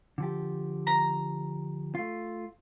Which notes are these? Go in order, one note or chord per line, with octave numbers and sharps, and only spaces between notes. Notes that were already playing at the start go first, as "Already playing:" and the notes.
D3 F3 G4
A#5
A3 F4